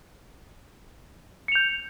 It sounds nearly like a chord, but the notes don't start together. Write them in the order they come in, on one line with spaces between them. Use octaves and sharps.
C#7 F7 G6